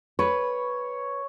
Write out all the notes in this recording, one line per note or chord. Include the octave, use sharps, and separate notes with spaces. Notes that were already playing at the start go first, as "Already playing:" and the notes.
B4 C#5